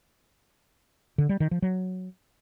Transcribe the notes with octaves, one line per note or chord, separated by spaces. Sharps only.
D3
G3
D#3
F3
F#3